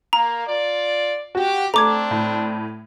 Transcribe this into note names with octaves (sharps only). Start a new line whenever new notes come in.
A#3 A#5
F4 D5
F#4 G4
A3 C4 D4 A#5 D6 G#6
A2